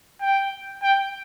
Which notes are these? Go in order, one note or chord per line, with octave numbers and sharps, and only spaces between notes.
G5
G5